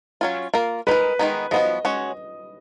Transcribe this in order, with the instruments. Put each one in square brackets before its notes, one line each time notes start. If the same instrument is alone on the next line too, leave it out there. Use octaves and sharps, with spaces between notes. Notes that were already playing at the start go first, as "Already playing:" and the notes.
[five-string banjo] F#3 C#4 F4
A#3 F4 A#4
[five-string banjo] G#3 D#4 A#4 [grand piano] B4
[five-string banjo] D#3 G#3 B3 D#4
[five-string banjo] F3 B3 F#4 [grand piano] D#5
[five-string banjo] G#3 C#4 F#4 C#5